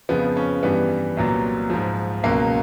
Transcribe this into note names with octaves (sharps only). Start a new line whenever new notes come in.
F2 C#3 F3 B3
C#4
G2 E3 G3 B3
C2 A#2 F#3
G#2 F3
C#2 B2 F#3 A#3